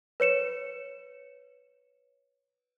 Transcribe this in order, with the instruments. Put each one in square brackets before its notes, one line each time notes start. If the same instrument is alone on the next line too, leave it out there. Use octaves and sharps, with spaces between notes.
[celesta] B4 C#5 C#7 E7